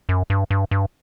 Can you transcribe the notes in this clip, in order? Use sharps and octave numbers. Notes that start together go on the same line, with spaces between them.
F#2
G2
G2
G2